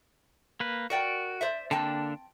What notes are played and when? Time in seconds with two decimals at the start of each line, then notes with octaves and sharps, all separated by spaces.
0.60 A#3 B4
0.90 F#4 A#4 D5 G5
1.41 C5 D5 E5
1.71 D3 A#3 C4 D4 G5 A5